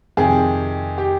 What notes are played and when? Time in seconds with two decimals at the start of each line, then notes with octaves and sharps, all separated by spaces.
0.17 F2 C3 D#3 G#4
0.98 G4